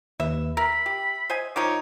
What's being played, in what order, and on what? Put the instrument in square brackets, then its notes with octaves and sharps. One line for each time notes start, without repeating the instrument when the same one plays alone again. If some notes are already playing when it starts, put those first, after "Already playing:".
[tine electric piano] D#2 B4 [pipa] E5
[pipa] A#4 [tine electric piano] E5 [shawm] B5
[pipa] G4
C5 D#5 G#5
[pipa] D#3 F3 D#4 [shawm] C#5 [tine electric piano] D6